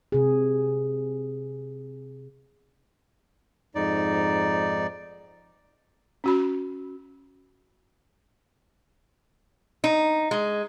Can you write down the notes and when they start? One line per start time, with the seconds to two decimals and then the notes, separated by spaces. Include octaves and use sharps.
0.12 C3 G#4
3.75 F2 G#2 D#4 D5
6.24 C#4 F#4 B5
9.84 D#4
10.31 G#3